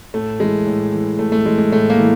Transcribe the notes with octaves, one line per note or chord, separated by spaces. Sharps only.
A2 A3
E3 G#3
A2
E3
A2 A3
A3
E3 G#3
G#3
A2 A3
A#3
E3